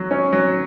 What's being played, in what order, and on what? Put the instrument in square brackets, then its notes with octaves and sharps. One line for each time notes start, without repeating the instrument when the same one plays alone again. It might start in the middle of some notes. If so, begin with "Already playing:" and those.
Already playing: [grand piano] F#3
C#4
F#3